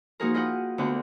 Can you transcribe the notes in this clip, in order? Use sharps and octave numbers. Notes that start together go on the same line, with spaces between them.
F3 A#3 D#4 F#4 G#4 A#4
E4 F4 G#4 D#5 F#5 G5
D2 D3 B3 F#4 G5 F#6